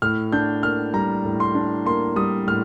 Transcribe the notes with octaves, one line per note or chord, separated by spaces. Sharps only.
A2 F6
D4 G6
A#3 F6
G3 A#5
A2
C6
D4
A#3 C6
G3 D#6
A2 F6